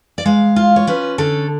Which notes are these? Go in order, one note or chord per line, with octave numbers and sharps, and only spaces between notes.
D5
G#3 F5
F4
C#5
C#4 B4
D3 A4